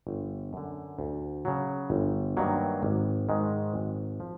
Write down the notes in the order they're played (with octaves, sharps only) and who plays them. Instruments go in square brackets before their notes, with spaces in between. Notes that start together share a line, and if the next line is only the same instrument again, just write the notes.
[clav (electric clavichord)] G1
F#2 D3
D2
C#3 F#3
G1
G2 D#3 F#3 A#3
G#1
G#2 D#3 G#3
G#1
F3